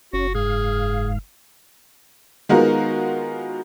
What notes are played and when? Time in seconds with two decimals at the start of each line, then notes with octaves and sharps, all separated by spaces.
0.13 F#1 C#4 F#4
0.35 G#2 G#4 F5
2.49 D#3 G#3 B3 F4 F#4 A#4